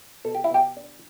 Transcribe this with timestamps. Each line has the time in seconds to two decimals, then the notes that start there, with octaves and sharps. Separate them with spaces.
0.25 B2 A4
0.35 G4
0.44 E4
0.51 B2 G4
0.77 D4